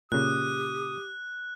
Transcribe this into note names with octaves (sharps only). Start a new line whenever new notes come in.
A#2 C#3 G4 D#6 F#6